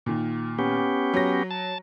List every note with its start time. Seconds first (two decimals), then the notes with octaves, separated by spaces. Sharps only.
0.06 A#2 D#3
0.59 B3 C#4 G4
1.14 F#3 A#6
1.51 A5